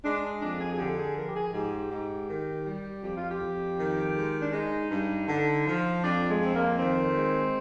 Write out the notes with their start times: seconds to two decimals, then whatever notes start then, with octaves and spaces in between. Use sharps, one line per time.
0.03 G#3 D4
0.41 F2 D4
0.59 G#4
0.72 G#4
0.78 D3 G4
0.97 G#4
1.16 F3 A#4
1.26 G4
1.34 G#4
1.53 G#2 G4
1.91 G#2
2.28 D#3
2.65 G3
3.03 F2 G4
3.16 F4
3.29 G4
3.41 F2
3.78 D#3
4.16 G#3
4.41 D4
4.53 G#3 D#4
4.90 G2
5.28 D3
5.66 F3
6.02 F2 D4
6.28 G#3
6.40 F2 C4
6.53 A#3
6.78 D#3 C4
7.16 G#3